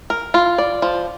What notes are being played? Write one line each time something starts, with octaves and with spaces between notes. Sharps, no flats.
A#4
F4
D5
F3